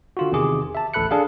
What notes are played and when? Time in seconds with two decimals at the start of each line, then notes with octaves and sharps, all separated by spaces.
0.17 D3 F4 F#4
0.32 E2 C3 D#3 G#4 D6
0.75 E5 A5
0.94 A1 D2 A4 B5 F#6 C#7
1.11 D4 G#4 A4 F5